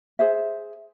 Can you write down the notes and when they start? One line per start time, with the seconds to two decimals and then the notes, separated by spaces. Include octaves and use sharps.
0.19 G#4 C5 E5